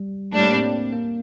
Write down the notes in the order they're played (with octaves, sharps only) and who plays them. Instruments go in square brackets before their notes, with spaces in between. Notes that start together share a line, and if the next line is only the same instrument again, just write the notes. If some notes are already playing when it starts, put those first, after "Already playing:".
Already playing: [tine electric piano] G3
[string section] A2 G3 D4 [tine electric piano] A3
[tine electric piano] A#3
C4
A#3